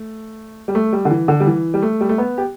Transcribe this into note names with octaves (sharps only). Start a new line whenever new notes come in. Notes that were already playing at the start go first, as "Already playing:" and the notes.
Already playing: A3
G3
A3
G3
D3
E3
D3
G3
E3
G3
A3
G3
A3
B3
G4